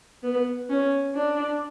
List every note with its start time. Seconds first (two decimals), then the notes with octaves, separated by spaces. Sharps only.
0.23 B3
0.70 C#4
1.15 D4